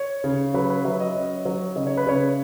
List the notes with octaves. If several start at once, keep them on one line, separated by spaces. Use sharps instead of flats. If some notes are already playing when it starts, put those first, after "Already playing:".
Already playing: C#5
C#3
F#3 B4
B4
F#3 E5
D#5
C#4
F#3
C#3 D#5
C#5
B4
C#3 C#5